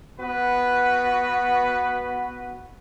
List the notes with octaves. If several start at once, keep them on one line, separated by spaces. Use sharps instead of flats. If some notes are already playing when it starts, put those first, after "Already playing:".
B3 F#4 B4